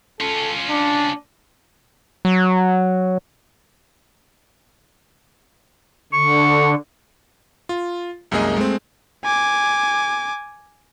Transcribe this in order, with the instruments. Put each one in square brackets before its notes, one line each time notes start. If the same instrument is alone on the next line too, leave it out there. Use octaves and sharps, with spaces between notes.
[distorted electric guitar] C#4 F4 [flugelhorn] A4
[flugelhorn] D4
[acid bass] F#3
[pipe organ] D3 [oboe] C#6
[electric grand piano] F4
C2 F#2 G#3 A#3 G#4 D#5
G#3 A3 C4
[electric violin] G#5 D6